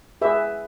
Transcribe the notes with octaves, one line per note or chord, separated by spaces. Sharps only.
G#4 B4 E5